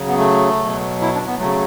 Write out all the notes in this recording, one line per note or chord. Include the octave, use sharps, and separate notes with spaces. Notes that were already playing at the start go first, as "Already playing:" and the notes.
Already playing: C#3 F#3
B3
A3
B2 F#3
E4
D4
B3
C#3 F#3 A3